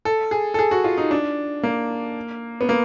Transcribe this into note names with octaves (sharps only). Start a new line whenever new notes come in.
A4
G#4
A4
G#4
F#4
F4
D#4
D4
A#3
B3
A#3